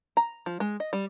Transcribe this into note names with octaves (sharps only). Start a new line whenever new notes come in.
A#5
F3
G#3
D#5
G3